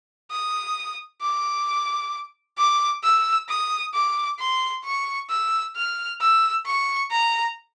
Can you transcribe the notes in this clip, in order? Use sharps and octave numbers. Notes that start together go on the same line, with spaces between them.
D#6
D6
D6
E6
D#6
D6
C6
C#6
E6
F6
E6
C#6
A#5